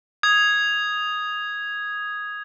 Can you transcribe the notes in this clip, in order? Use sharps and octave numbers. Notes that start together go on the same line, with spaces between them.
D#6 G#6